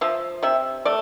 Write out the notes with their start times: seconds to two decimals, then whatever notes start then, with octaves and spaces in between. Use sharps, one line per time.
0.01 F3 E5
0.43 C3 E5
0.85 A3 D5